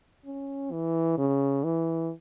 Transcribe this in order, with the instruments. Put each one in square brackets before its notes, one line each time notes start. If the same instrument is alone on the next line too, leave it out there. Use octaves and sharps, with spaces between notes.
[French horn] C#4
E3
C#3
E3